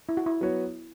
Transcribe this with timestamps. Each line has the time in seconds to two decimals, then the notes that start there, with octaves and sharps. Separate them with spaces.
0.09 E4
0.17 F#4
0.26 E4
0.41 F#3 B3 F#4 C#5